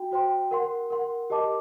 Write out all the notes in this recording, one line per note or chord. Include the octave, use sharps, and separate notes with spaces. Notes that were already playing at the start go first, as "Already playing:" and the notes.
Already playing: F#4 G5
F#4 C5 G5 C6
A#4 F#5 C6
A#4 F#5 C6
G4 A#4 D#5 A5 D6